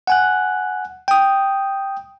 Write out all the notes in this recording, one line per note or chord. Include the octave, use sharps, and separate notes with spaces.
F#5 G#5 F#6
G5 D#6